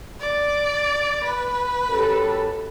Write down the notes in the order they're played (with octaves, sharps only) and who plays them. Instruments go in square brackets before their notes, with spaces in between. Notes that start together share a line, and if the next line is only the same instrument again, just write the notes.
[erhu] D5
B4
[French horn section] F#2 G4 A4